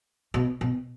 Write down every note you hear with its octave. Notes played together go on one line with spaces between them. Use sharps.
B2
B2